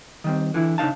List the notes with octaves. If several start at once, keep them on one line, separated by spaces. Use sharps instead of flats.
D#3 G3 C4
D3 E3 E4
C#3 D4 D#4 F5 A5